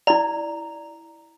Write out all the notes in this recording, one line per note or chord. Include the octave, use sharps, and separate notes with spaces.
E4 D5 A#5